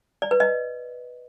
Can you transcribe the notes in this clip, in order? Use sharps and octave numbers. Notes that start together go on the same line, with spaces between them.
D5
B4
D#5